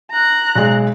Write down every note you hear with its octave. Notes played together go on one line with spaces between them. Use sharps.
A#5 F#6
B1 G#3